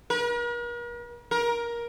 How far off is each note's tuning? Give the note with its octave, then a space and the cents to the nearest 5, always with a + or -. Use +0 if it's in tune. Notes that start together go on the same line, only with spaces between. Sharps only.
A#4 +45
A#4 +15